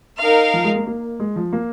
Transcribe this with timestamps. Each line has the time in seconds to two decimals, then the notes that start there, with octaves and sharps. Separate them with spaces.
0.20 D#4 A#4 F5
0.54 F3
0.64 G#3
0.76 A#3
0.87 A#3
1.20 G#3
1.36 F3
1.53 A#3